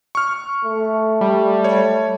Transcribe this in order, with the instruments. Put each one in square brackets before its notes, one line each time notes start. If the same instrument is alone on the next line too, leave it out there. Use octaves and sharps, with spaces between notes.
[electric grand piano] C#6 F6
[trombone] A3
[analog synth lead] G3
[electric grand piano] C#5